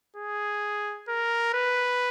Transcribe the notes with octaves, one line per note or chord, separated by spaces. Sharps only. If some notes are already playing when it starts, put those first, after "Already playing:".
G#4
A#4
B4